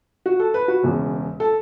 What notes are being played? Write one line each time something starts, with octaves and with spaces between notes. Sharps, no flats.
F#4
A4
B4
F#4
E1 E2 C#3
A4